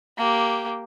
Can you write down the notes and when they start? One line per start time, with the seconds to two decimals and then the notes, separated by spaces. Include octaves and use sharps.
0.18 A#3 G4